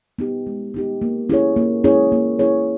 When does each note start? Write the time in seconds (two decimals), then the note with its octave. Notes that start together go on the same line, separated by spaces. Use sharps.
0.19 B3 D#4 G4
0.47 G#3
0.74 B3 D#4 G4
1.02 A#3
1.29 C#4 E4 G#4 C#5
1.56 A#3
1.84 C#4 E4 G#4 C#5
2.12 A#3
2.39 C#4 E4 G#4 C#5